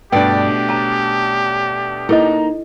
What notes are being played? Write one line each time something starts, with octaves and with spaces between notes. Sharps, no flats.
G2 B2 A3 D4 G4 D5 G5
C#4 A5 A#5
A#3 D#4 E4 A4 D#5